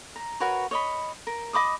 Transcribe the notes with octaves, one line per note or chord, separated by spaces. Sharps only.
A#5
F#4 A#4 B4 C#5
C#5 D#5 B5
A#4
D#5 B5 D6 D#6